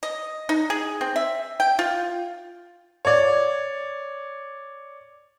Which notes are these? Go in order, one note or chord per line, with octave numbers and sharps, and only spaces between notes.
D#5
D#4
G#4
C4
E5
G5
F4
C#5 D5